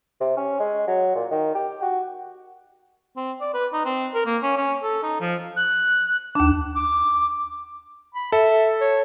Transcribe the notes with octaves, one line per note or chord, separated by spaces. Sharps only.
C3
C#4
G#3
F#3
A#2
D#3
G4
F#4
C4
D5
B4
D#4
C4
A#4
A#3
C#4
C#4
A4
D#4
F3
F#6
D#2 D4 A5
D6
B5
A4 E5
C#5